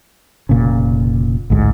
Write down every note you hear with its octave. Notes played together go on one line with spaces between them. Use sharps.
F1 A#2 C#3
A1 D2 G#2